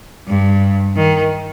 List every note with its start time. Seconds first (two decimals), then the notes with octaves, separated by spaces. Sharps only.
0.27 G2
0.96 D#3